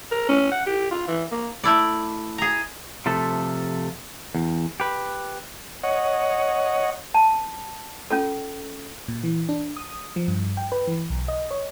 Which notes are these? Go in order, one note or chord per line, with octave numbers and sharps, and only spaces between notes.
A#4
C#4
F#5
G4
F4
E3
A#3
A3 E4 D5
G#4 A#5
C3 F3 A3 A4
E2
G4 B4
C#5 D#5 F#5
A5
C#4 F4 A4
A#2
E3
D4
D#6
F3
G2
G5
B4
E3
B1
D#5
C#5